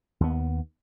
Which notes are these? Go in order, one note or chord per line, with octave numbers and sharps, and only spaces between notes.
D#2 B3